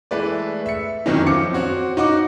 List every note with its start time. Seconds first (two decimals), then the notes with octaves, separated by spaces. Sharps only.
0.11 E3 G#3 A3 B4 D5
0.66 E5 C#7
1.06 F2 D#3 E3 F#3 C#4 D#4
1.26 F3 D6 C#7
1.53 C4 F#4 C#5
1.97 D#4 F#4 D#5 F#5 D6